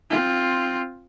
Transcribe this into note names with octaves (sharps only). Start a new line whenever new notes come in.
C4 F4